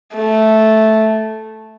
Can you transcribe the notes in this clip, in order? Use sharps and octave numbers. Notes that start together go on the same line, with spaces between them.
A3